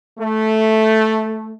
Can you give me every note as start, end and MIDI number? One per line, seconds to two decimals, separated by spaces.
0.18 1.55 57